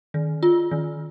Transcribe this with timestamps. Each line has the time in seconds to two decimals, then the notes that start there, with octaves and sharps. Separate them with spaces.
0.14 D#3
0.43 F4
0.71 D#3